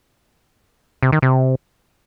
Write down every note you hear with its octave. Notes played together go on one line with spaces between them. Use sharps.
C3
D#3
C3